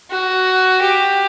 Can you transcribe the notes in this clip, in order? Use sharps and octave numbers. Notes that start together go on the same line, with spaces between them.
F#4
G4